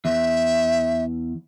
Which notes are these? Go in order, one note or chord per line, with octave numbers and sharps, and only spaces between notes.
E2 E5